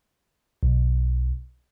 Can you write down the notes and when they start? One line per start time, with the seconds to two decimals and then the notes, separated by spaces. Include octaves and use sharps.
0.63 B1